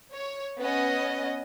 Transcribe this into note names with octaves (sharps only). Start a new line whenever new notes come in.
C#5
B3 C#4 D#5